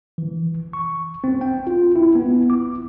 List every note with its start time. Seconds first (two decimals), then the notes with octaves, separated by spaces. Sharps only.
0.18 E3
0.73 C#6
1.24 C4
1.41 G5
1.67 F4
1.96 E4
2.15 B3
2.50 D6